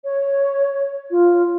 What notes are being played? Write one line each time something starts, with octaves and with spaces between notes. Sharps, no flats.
C#5
F4